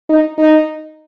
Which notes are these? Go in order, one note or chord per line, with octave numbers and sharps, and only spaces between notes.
D#4
D#4